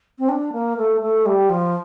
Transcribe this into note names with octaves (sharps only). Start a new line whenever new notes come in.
C4
D4
A#3
A3
A3
G3
F3